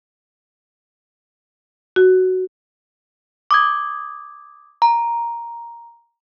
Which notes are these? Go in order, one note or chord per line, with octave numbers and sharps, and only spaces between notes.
F#4
D6 D#6 G#6
A#5